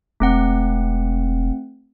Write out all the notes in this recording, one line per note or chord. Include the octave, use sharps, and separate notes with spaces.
E1 A3 C4 F#5